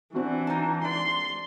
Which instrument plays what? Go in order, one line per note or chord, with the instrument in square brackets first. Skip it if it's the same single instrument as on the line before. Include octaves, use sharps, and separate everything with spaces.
[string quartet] E3 [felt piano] C4 D4 F#4
[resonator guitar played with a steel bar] D#4 A5
[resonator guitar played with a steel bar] D5 [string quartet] C6